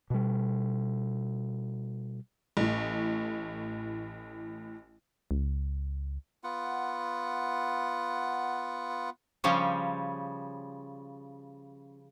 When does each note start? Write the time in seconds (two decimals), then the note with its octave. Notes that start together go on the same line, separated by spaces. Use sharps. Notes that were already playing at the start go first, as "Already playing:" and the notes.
0.10 B2 G3
2.57 A1 A2
5.31 C#2
6.43 B3 F4 F#5
9.44 C#3 F3 G3 C#4